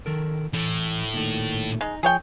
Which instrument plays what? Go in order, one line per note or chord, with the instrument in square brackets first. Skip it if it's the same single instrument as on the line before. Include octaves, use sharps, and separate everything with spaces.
[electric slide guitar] D#3 A4 A#4
[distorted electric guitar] A2 [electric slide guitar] E3
[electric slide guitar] A#2 D#3 A3
[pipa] G#3 [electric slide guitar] D#4
[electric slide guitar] F3 [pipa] G#4 C#5 G5